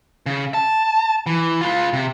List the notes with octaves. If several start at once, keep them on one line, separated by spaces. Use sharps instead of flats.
C#3
A5
E3
F4 B4
C3